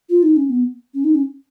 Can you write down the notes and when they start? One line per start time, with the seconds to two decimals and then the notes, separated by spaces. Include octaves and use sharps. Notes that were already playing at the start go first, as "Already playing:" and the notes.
0.09 F4
0.23 D#4
0.37 C#4
0.50 B3
0.94 C#4
1.04 D#4
1.15 C#4